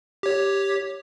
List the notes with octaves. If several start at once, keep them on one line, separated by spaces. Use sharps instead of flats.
G4 C#5